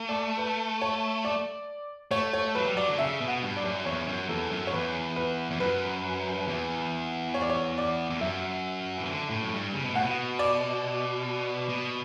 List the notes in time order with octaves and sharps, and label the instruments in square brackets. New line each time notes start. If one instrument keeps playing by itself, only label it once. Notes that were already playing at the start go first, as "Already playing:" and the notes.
Already playing: [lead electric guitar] A3
[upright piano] D5
B4
C#5
D5
[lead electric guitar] A3 [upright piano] C#5
[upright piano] C#5
[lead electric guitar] F#3 [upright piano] B4
[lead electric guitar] G3
[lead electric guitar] F#3 [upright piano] D5
[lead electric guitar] D3
[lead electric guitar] C#3 [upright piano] E5
[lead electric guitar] B2
[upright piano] F#5
[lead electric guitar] G2
[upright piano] D5
[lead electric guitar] F#2
[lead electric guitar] E2 [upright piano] C#5
[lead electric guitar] F#2
[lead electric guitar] E2 [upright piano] A4
[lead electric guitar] F#2
[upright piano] C#5
[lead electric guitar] E2 [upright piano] B4
[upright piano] B4
[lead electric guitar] E2
[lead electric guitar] F#2 [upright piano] B4
[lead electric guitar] E2
[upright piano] C#5
D5
C#5
D5
[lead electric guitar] E2
[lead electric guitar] F#2 [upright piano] E5
[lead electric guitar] E3
D3
A2
F#2
G2
C#3
B2
[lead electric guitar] A2 [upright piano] F#5
[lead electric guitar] B2
[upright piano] D5
[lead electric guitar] B2